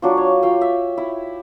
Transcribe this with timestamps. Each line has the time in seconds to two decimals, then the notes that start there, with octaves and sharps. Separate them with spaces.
0.02 F#3 D4 F4
0.17 C#5
0.43 F4 F5 G5
0.61 E5
0.97 E4